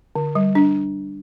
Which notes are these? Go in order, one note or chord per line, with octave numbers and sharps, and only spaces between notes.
D3
G3
D4